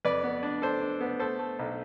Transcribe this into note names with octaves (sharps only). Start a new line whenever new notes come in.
F2 B4 D5
B3
D4
D4 A4 C5
D4
B3
A3 A4 C5
A3
B1